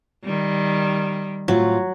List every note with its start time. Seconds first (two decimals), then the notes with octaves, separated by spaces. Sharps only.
0.24 D#3 G3
1.48 A2 F#3 C4 F4